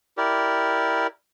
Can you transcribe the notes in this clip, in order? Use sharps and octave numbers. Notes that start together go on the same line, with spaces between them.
E4 G4 A#4 D5